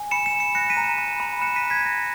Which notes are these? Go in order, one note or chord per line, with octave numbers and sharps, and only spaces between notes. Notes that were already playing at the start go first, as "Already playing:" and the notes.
Already playing: G#5
B5 C#7 E7
C#7 E7
B5
C#7 E7
F#6 A#6 C#7
B6 D#7
A#5
C#7 E7
B5
B5
F#6 C#7 E7
B6 D#7
A#5
G#6 B6
A#5 A#6